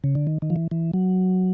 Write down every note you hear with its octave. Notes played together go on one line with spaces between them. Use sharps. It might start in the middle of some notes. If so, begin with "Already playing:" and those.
C#3
D3
D#3
D#3
F3
E3
E3
F#3